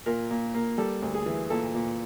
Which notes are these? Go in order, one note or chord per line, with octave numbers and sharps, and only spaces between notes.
A#2 A#4
A#2
A#3
G3 A4
D2
G#4
E3
A#2 A4
A#2